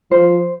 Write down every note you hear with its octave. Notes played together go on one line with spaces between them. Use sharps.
F3 C5